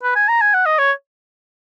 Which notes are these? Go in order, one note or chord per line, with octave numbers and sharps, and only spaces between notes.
B4
G#5
A#5
G#5
F#5
D#5
C#5